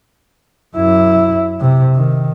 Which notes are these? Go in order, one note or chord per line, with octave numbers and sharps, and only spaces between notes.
F#2 E4
C3
D#3